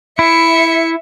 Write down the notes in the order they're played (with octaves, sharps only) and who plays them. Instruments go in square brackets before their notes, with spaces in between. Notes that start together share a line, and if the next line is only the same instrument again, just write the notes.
[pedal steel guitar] E4 [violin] E5 C#7